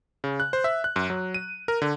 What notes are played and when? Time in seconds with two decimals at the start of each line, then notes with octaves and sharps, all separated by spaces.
0.24 C#3
0.40 F#6
0.53 C5
0.64 E5
0.84 F#6
0.96 F#2
1.10 F#3
1.34 D#7
1.68 A#4
1.82 D3